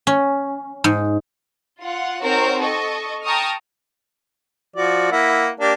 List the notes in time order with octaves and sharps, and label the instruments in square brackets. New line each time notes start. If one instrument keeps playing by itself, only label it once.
[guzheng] C#4
G#2
[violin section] F4 F#5
C4 D#4 F#4 A#4 C5 C#5
A4 D#5 C#6
G5 A5 A#5 C#6 D#6 F6
[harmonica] F3 F#4 D5
A#3 E4 F#5
A#3 D4 G4